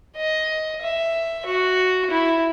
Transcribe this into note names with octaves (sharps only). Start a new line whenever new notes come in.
D#5
E5
F#4
E4